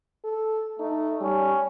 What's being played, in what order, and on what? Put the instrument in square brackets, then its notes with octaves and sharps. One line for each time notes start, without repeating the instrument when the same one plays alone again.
[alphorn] A4
[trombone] A3 [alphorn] D#4
[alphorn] G3 [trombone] C#4